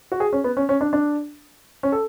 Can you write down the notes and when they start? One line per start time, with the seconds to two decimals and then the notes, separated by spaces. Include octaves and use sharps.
0.12 F#4
0.20 G#4
0.33 C#4
0.44 B3
0.57 C#4
0.69 C#4
0.81 D4
0.93 D4
1.83 C#4
1.92 A4